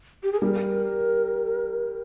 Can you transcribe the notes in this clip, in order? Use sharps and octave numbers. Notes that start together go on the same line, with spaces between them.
G4
G#4
G3 A#4